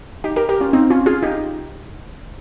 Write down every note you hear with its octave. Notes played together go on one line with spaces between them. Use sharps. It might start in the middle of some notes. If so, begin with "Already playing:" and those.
D#4 G4
G4 A#4
G4 A#4
C#4 F4
C4 D#4
C#4 F4
F4 G#4
D#4 G4